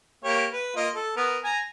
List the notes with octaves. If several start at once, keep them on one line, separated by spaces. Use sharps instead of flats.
A#3 G4 C#5
B4
A#3 F4 D#5
A4
B3 A#4
G#5 A#5